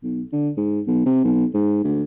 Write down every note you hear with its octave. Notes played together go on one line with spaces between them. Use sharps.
B1
D3
G#2
B1
C3
B1
G#2
D2